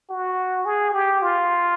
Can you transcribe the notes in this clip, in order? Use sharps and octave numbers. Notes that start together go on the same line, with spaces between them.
F#4
G#4
G4
F4